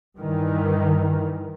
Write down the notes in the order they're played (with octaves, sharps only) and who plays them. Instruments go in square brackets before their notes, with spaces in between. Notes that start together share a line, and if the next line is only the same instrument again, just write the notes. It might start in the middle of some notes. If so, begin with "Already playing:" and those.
[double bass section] G2 D#3 E3